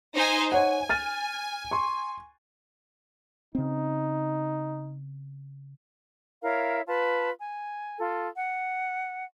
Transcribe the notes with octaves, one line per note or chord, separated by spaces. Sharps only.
D#4 C5 G#5
D#4 C#5 F#5 G#5
F6 A6 D#7
C6 C#6
C#3 C4 D#4
E4 A#4 C#5 F5
F4 B4 A5
G#5
F4 A4
F#5